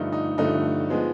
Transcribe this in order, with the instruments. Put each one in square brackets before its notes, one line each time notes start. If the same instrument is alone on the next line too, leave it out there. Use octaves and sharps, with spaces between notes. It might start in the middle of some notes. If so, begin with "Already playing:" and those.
Already playing: [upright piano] G2 D3 F3 A3 D#4
D#4
G2 D3 F3 A3 D#4
F3 G#3 B3